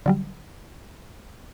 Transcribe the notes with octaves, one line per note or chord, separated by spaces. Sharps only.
D3 F#3 G3